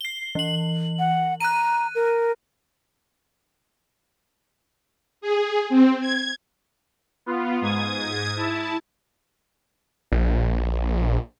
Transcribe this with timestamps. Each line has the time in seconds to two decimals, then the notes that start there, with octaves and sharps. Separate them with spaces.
0.01 C7 G7
0.35 E3 F#7
0.99 F#5
1.40 A#5 F#6 D#7
1.95 A#4
5.21 G#4
5.69 C4
6.01 G#6
7.26 B3 F4
7.61 G#2 D#6 G#6
8.37 E4 A5
10.12 A#1